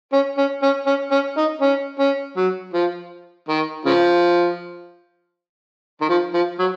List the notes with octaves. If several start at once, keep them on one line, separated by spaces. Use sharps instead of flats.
C#4
C#4
C#4
C#4
C#4
D#4
C#4
C#4
F#3
F3
D#3
C#3 F3
D#3
F3
F3
F#3